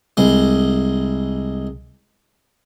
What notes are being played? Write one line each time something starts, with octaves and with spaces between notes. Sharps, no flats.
C2 G#3